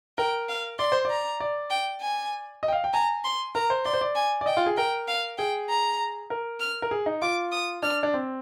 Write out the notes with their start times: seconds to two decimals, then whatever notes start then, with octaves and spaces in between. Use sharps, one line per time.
0.18 A#4 G5
0.49 F5
0.79 D5 C6
0.92 C5
1.05 D5
1.10 A#5
1.40 D5
1.71 G5
2.01 G#5
2.63 D#5
2.68 G5
2.73 F5
2.84 G5
2.93 G#5 A#5
3.24 C6
3.55 A#4 A#5
3.70 C5
3.85 D5 C6
3.93 C5
4.01 D5
4.15 G#5
4.41 D5
4.46 D#5 G5
4.57 F4
4.66 G#4
4.77 A#4 G5
5.08 F5
5.38 G#4 G5
5.69 A#5
6.30 A#4
6.60 F6
6.82 A#4
6.91 G#4
7.06 D#4
7.22 F4 D6
7.52 D#6
7.83 D4 F6
8.03 D4
8.14 C4